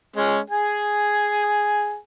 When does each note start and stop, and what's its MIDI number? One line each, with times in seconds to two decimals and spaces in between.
0.16 0.39 56
0.16 0.39 61
0.50 1.97 68
0.50 1.97 80